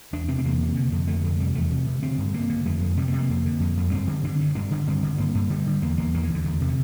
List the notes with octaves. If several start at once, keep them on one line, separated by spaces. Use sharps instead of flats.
E2 D4
C3 C4
C4
E2 A#3
C3
D3
F2
D3 A3
F2
C3 G3
E2 A3
C3
C3
D3 C4
G2
D3 A#3
D3
F2 A3
F2
C3 G3
A#3
C3
A#3
F2
D3
F2
F2
G2 C4
D3
D3 D4
G2
G2 D4
D3
G2 C4
D3
G2 A#3
G2
D3 G3
D3
E2 A#3
E2 A#3
E2 A#3
E3
E2 D3
E2
C3
D3